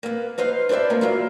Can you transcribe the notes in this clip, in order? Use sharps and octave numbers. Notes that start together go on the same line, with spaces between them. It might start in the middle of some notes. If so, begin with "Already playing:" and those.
A#3 B3
D#4 B4 C5 F5
D4 E4 C5 D5 E5
G#3 A#3 B3 C#4 D4
F#3 A#3 E4 F4